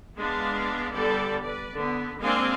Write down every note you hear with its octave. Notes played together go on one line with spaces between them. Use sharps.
G#3 B3 D4 F5
D3 G3 B3 A4 D5
B4 D5
D3 B3
G#3 A#3 C4 D4 F5 G#5